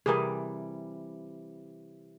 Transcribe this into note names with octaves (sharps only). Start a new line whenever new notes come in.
C3 E3 G3 G#4 A#4